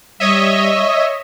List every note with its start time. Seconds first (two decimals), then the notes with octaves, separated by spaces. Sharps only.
0.20 G3 C#5 D#5 E5